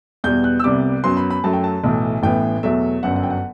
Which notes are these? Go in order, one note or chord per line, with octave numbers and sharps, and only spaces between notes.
E2 B2 G3 B3 G6
F#6
E6
C2 C3 G3 B3 D6
F#2 F#3 B3 C6
B5
B5
F#2 F#3 A3 A5
G5
A5
B1 A2 E3
A1 A2 E3 B3 G5
E2 B2 F#3 A3 E5
G1 F#2 F#3 F#5
F#5
G5
F#5